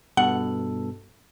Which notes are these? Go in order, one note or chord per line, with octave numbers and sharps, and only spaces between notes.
G2 B2 A4 F#5